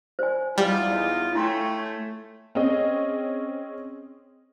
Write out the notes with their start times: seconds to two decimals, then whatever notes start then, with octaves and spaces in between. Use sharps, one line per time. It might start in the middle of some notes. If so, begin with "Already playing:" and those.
0.19 C5 D5 G#5
0.58 E2 G3 D#4 F4
1.35 A3 E4 C#5 G5 G#5 C6
2.55 C4 C#4 G#4 D#5